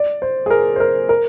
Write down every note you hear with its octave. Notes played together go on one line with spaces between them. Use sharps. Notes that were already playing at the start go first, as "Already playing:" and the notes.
Already playing: D5
C5
G#4
A#4
C5
A#4
A#4